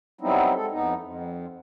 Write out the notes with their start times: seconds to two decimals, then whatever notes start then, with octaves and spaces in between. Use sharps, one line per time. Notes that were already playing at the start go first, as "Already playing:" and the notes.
0.21 F#3 G3 B3 C4 D#4 E4
0.55 G#3 A4
0.72 F2 B3 D#4
1.00 F2